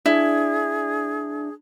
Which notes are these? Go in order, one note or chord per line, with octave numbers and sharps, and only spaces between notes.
D4 E4 G#4